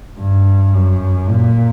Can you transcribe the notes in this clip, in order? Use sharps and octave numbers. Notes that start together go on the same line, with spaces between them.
G2
F#2
A#2